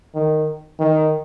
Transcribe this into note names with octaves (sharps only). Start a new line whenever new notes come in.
D#3
D#3